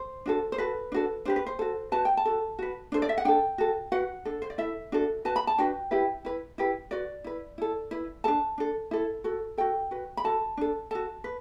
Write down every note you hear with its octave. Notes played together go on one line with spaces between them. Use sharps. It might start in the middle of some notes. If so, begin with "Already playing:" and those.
Already playing: C5
D4 F#4 A4
C5
F#4 A4 B4
D4 F#4 A4
D4 G4 B4 C5
B4
C5
F#4 A4
F#4 B4 A5
G5
A5
F#4 A4
F#4 B4
D4 A4 C5
D5
E5
F#5
D4 A4 G5
F#4 A4
F#4 B4 F#5
D4 A4
C5
D5
E4 A4 E5
D4 F#4 A4
F#4 B4 A5
B5
A5
D4 F#4 B4 G5
E4 G4 B4
E4 B4
E4 G4 B4
F#4 B4 D5
E4 B4
E4 A4
E4 B4
D4 A4 A5
D4 A4
E4 A4
F#4 A4
F#4 A4 G5
F#4 B4
B5
F#4 A4 A5
D4 A4
F#4 A4 A5
B4